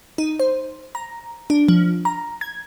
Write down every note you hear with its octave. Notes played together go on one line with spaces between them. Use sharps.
D#4
C5
A#5
D4
F3
A#5
G#6